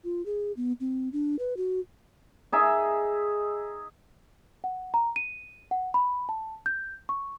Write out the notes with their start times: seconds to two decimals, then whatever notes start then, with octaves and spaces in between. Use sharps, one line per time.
0.04 F4
0.26 G#4
0.57 B3
0.80 C4
1.13 D4
1.39 B4
1.57 F#4
2.52 D#4 G#4 E5
4.64 F#5
4.94 A#5
5.16 D#7
5.71 F#5
5.94 B5
6.29 A5
6.66 G6
7.09 C#6